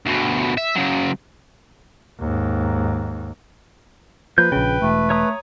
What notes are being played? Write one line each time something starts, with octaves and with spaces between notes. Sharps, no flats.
D2 B2
E5
C#3 F#3
D#2 G#2
F3 A#3 B4 G6
A#1 C#3 G5
E1 A3
A3 C#5 A#5 D#6